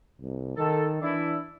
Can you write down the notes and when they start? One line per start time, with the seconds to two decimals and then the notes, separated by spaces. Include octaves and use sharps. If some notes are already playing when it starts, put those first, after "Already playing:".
0.21 C2
0.57 D#3 A4
1.02 E3 D4 E4